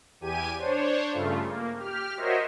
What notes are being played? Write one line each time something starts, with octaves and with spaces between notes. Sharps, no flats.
E2 G4 G#5 D#7
D4 C5 C#5
G2 C#3 A3 F4
A#3
G4 F6
F#4 A#4 C5 C#5 D#5 E5